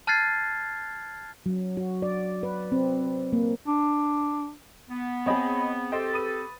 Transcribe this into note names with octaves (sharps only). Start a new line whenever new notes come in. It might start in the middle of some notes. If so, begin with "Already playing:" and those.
A5 F6 F#6 G#6 A6 C7
F#3
F#4
D5
B4
C4
A#3
D4
B3
C4 G#4 C#5 D#5 B5
G4 A4 C5 D#5 G5 A6
B4 D#6 D#7